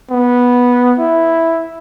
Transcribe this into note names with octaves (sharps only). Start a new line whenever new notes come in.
B3
E4